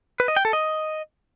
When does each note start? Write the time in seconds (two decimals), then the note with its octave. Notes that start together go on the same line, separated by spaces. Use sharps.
0.20 B4
0.28 D#5
0.37 G5
0.45 A4
0.53 D#5